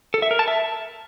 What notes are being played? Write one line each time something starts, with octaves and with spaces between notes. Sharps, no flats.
A4
E5
A#4
A5
E5